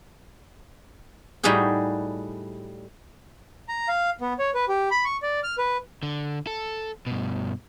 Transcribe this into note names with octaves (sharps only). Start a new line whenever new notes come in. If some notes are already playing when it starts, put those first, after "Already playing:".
A2 G3 D#4 F#4 G#4 G5
A#5
F5
B3
C#5
B4
G4
B5
C#6
D5
F6
B4
D3
A4
G2 B2